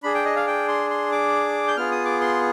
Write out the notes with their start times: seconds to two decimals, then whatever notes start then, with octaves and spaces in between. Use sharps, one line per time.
0.03 D4 G#4 B5
0.15 G5
0.25 D#5
0.36 F5
0.47 G5
0.68 C6
0.90 C6
1.12 D6
1.68 G6
1.77 B3 F4 G#4 F6
1.91 D#6
2.06 D6
2.21 C6